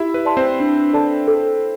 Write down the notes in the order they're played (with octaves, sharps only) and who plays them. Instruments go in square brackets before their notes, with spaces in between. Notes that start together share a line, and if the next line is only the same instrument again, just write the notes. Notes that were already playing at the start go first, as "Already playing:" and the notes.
Already playing: [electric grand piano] E4 E5 [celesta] G4
[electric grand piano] B4
[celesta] D5 A5 C6
[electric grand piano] C4 C5
[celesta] D4
A4 D5 A5
A4